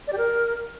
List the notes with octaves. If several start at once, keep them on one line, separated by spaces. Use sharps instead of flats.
D5
G4
A#4